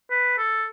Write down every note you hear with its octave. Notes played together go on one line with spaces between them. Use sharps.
B4
A4